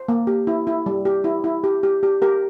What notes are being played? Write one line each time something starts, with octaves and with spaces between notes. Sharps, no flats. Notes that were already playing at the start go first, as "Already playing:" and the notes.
Already playing: C5
A#3
G4
E4
E4
G3
G4
E4
E4
G4
G4
G4
G4 A#4